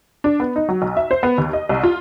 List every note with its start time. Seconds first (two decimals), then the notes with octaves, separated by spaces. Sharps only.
0.24 D4
0.40 B3
0.56 D#4
0.69 F#3
0.82 B1
0.97 E5
1.11 C5
1.23 B3
1.38 D#2
1.53 D#5
1.69 C2
1.84 F4